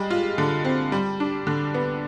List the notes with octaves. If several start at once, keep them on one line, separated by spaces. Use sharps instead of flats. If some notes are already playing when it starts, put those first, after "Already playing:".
Already playing: G3 G#3
F4
D3
C4
G3
D4
D3
B3